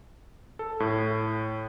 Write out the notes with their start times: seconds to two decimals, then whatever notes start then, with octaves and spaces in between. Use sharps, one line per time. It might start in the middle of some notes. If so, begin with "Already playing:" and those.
0.59 A4
0.80 A2